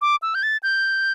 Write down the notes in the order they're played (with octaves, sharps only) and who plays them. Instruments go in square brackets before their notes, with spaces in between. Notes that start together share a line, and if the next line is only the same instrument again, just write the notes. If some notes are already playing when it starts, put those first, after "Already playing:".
[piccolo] D6
E6
G6
A6
G6